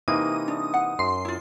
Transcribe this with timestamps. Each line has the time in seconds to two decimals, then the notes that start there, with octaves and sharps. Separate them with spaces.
0.08 C3 E3 A#3 D#4 D#6
0.48 D4
0.74 F#5
0.99 F#2 C6
1.25 E4 F4